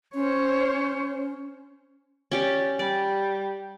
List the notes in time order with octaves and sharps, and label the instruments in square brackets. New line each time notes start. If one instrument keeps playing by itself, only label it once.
[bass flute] C#4 [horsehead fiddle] C5 C#5
[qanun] C#4 G4 D5
[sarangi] G3 [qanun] D5